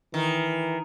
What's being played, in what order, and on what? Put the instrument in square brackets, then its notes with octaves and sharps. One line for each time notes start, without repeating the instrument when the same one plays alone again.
[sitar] D#3 [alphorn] E3